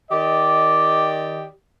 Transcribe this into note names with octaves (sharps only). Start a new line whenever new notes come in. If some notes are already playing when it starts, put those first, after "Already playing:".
D#3 G4 D5 D#5